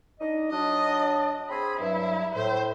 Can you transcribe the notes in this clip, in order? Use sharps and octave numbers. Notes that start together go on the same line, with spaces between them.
D4 D#4 D#5
F#3 D4 D#5
C4 G#4 B5
G2 F#3 E4
A2 C5